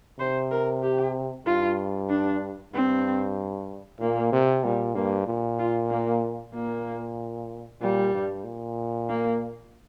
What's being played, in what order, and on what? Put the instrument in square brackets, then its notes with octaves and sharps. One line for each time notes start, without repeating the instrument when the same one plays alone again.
[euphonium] C3 [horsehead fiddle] C5
[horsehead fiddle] A#4
G4
[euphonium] G2 [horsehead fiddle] F4
[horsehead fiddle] D4
[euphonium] G2 [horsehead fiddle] C4
[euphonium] A#2 [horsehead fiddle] A#3
[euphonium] C3
[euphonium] A#2 [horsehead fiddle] G3
[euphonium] G2 [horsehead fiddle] A#3
[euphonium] A#2
[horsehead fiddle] F4
A#3
[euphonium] A#2 [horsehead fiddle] A#3
[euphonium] A#2 [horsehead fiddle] G3
[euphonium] G2
A#2
[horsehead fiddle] A#3